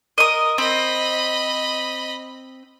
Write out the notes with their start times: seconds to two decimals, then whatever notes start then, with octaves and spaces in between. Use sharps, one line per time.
0.18 A#4 D#5 D#6
0.58 C4 D#5 B5